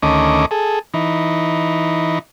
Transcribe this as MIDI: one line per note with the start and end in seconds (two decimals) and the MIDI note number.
0.03 0.46 38
0.03 0.46 51
0.03 0.46 57
0.03 0.46 61
0.03 0.46 75
0.03 0.46 86
0.51 0.79 68
0.51 0.79 69
0.94 2.19 52
0.94 2.19 63